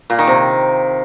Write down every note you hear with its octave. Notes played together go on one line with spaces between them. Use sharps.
A#2
D#3
C3